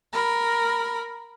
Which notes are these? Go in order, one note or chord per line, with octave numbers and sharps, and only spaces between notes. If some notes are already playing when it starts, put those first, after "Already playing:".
A#4 B5